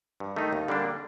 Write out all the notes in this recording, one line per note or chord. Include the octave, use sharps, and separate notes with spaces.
G2
D#3 A3 D#4
D#2
D3 G3 A#3 D4